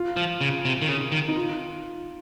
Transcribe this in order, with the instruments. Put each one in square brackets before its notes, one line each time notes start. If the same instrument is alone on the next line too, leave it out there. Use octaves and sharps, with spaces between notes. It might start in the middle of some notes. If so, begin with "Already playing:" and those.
Already playing: [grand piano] F4
[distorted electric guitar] F3
C#3
C3
D#3
C#3
D#3
[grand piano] D#4
F4